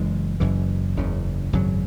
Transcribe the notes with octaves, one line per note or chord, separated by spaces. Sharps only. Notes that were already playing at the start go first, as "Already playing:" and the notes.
Already playing: F#1 F#2 E3 G#3
F#1 F#2 E3
F#1 E2 C#3
G#1 F#2 C#3 F#3